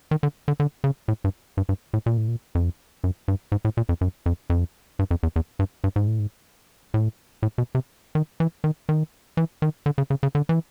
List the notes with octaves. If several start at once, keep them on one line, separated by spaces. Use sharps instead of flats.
D#3
D3
D3
D3
C#3
A2
G2
G2
G2
A2
A#2
A2
A#2
F2
F#2
G2
G#2
A2
A#2
F2
F#2
F2
F2
G2
F2
E2
E2
G2
G2
G#2
A2
G#2
A2
A2
B2
C3
D#3
E3
D#3
D#3
E3
D#3
D3
C#3
C#3
C#3
D3
E3